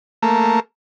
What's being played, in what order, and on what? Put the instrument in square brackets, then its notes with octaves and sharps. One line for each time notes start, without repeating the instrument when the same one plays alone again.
[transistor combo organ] A3 A#3